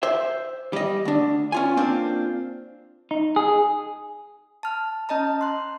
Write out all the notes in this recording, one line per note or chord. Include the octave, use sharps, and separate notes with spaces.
C5 E5
G3 D#5
D2 D4
C#4 F4 G#5
A#3 C4 D4 F4
D#4
G#4
A5 F6
C#4 D#5 A5 A#5
C6 F#6